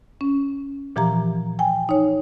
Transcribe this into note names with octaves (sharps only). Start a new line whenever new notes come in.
C#4
A#2 E3 F3 G4 A#5
G5 G#5
D#4 C#5